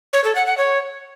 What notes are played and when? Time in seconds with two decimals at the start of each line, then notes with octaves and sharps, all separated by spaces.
0.13 C#5
0.24 A4
0.35 F#5
0.46 F#5
0.58 C#5